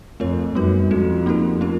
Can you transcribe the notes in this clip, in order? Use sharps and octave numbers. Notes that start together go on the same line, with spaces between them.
F2 A3 C4 F4 A#4 C#5
F#2 G3 B3 D#4 F#4 B4
F2 G#3 C#4 F#4 A4
A#3 D#4 G4 A#4
A3 C#4 F4 A#4